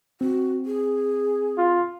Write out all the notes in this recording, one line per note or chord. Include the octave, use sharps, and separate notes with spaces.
C4 F#4
G#4
F4